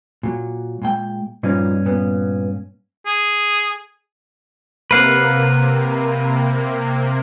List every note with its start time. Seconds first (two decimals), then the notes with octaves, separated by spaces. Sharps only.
0.23 A#2 F#3
0.82 A#2 G#3 G5
1.43 G2 A#2 F3 C#4 D#4
1.86 A#2 B3
3.06 G#4
4.91 C3 A#3 B4 F5 F#5